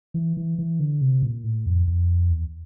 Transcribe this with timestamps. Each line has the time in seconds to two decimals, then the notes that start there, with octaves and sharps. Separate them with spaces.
0.14 E3
0.37 E3
0.58 E3
0.80 D3
1.01 C3
1.22 A#2
1.44 A2
1.66 F2
1.87 F2
2.30 E2